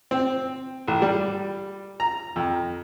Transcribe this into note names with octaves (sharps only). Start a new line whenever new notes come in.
C4
A1
G3
A#5
F2